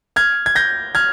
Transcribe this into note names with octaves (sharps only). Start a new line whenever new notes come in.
F6 G#6
G#6
G6 A#6
F6 G#6